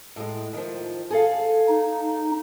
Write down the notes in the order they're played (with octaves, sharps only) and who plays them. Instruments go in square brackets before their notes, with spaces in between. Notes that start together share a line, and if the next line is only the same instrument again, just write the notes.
[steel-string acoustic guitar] A2 G#3
D#3 F3
G#4 A4 F5
[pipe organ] D#4